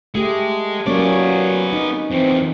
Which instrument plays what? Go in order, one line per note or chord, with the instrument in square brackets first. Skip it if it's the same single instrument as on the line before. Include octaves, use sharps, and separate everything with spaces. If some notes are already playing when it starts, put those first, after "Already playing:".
[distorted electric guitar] G#3 G#4 [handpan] A3 G4
[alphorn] F#3 [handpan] A#3 C#4 C#5 [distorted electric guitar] B3 D5
[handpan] D#4
[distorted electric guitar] F2 E3 [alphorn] C4